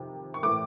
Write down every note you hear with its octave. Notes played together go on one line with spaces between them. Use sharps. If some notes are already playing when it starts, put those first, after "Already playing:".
Already playing: F2 C3 D#3
C#6
A2 E3 A3 D6